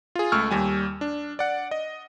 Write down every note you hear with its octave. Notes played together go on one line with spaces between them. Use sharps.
F4 G#4
C#2 A3 C#6 E6 F6
D#2 G3 G#5
D4
D5 F#5
D#5